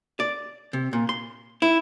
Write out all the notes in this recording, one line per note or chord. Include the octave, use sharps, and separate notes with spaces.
D5
C3
A#2
C6
E4